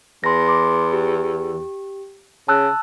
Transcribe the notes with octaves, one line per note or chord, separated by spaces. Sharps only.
E2 C6 A#6
C6 D6
G4
C#3 A5 E6 F#6